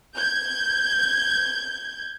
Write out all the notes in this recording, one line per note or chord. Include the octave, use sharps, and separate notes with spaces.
G6 G#6